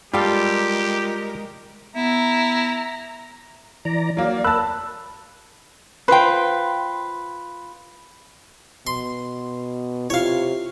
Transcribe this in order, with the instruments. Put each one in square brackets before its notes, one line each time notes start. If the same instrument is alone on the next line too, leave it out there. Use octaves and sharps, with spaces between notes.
[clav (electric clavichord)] G3 A4 [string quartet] G#3 A#4 [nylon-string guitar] F4 G5 [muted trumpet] G4
[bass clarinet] B3 [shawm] E4 [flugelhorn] E5 [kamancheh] A#5
[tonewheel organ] E3 D5 A#5
[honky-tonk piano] F#3 A#3 [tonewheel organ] D5
[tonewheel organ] A#4 [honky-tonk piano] A5 F#6 [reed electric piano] B5 E6
[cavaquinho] F4 B4 [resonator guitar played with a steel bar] C5 G5
[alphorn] B2 [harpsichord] C6
[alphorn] C3 [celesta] E4 F4 [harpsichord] C#5 F5